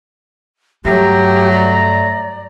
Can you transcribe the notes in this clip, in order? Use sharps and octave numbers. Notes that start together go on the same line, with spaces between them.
G2 F#3 A3 G4 A#5
D5